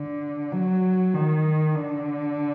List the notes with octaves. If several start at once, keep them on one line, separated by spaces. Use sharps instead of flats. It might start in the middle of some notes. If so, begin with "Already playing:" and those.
Already playing: D3
F#3
D#3
D3